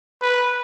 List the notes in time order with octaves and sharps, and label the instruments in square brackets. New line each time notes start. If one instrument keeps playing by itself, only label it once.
[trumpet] B4